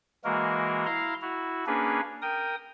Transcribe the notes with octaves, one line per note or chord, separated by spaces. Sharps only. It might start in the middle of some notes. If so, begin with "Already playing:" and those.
E3 G#3 A#3 F#4 A#4
E4 F5 A#5 C6
E4 F#4
A#3 C#4 D4 G#4 B4
A#4 G5 D#6